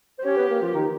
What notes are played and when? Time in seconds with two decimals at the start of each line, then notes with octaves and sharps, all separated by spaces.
0.19 C5
0.25 C#4 G4 C#5
0.37 B3 B4
0.49 A#3 A#4
0.61 F3 F4
0.74 D#3 D#4